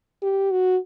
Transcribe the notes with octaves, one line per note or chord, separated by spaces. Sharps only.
G4
F#4